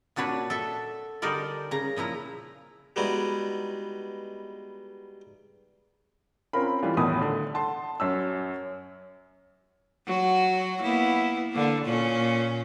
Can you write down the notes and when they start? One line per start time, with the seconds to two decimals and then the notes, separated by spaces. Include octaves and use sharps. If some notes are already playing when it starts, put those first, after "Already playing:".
0.16 A#2 D4 F#4 B4 C#5
0.50 A4 E5
1.22 D3 G3 D#4 G4 A#4 D5
1.71 C#3 A#5
1.96 A#2 F3 E4 A#5
2.96 G3 G#3 B3 D#4 E4 F#4
6.53 C4 C#4 F4 A#4 B5
6.83 E3 G3 F4
6.97 B1 E2 A2 D#3 B5 D#6
7.21 D3
7.54 F#5 A5 C6
8.00 F#2 C#4 E6
10.06 F#3 F#4
10.82 A#3 B3 E4
11.52 D3 A#3
11.85 A#2 C#4